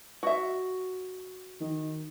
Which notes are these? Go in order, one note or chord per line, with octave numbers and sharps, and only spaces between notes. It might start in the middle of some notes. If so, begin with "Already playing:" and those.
F#4 E5
D#3